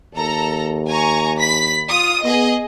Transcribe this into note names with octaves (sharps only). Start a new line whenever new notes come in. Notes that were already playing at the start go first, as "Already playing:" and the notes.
D#2 A4 A#5
G#5 A#5 C#6
B5 B6
F4 D#6
B3 G#4 D#5